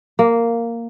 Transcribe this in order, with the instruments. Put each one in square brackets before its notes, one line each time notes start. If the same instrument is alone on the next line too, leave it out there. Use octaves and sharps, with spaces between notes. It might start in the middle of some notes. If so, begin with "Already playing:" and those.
[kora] A#3